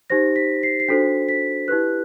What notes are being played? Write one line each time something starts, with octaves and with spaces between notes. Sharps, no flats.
D#4 G4 C5 A#6
B6
C7
C7
D4 F#4 A4 C5 B6
B6
E4 G4 B4 F#6